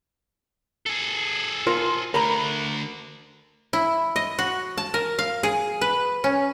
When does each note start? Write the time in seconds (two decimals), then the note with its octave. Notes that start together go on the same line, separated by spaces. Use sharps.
0.86 G#4 A4
1.67 F4 A#4 C5
2.14 D2 D3 A#4 A#5 B5
3.73 E4
4.16 D#5
4.39 F#4
4.78 A5
4.94 A#4
5.19 F5
5.43 G#4
5.81 B4
6.24 C#4